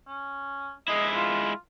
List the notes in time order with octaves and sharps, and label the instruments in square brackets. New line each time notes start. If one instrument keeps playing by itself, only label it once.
[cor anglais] C#4
[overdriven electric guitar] G#3 E4 [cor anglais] D#5
[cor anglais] F4